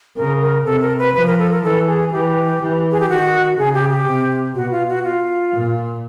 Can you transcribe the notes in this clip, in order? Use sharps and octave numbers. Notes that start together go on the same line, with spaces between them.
C#3 A#4
A#4
C3 A4
A#4
B4
F3 B4
A#4
A4
A#4
E3 A4
G#4
E3 G4
E3
G#4
G4
D#3 F#4
C#3 G#4
G4
G4
C3
B2 F#4
F4
F#4
F4
A#2